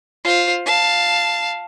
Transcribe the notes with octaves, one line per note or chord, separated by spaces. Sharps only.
F4 C5
F5 A5